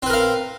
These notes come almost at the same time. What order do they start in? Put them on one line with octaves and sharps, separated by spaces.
C4 B4 A#4 F5